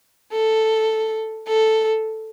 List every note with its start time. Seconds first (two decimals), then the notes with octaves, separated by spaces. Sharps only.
0.32 A4
1.47 A4